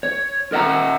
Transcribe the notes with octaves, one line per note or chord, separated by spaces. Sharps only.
C#5
A#4 D#5 E5 F#5 G5 A#5